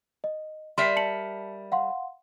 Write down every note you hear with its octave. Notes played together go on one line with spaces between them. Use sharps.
D#5
G3 A#4 E5 C6 C7
A5 C#7 F#7
F5 F#5 C6